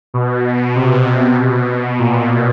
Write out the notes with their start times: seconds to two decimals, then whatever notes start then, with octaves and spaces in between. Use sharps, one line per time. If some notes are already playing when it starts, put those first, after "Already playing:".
0.14 B2
0.75 C3
1.06 C3
1.37 B2
1.99 A#2